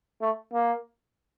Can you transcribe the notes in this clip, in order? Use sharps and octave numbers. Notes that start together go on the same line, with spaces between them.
A3
A#3